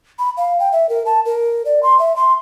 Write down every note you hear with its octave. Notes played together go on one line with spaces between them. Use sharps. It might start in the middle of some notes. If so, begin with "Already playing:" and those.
B5
F5
G5
E5
A#4
A5
A#4
D5
C6
E5
C6